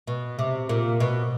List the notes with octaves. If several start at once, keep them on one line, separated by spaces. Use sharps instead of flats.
B2
C3
A#2
B2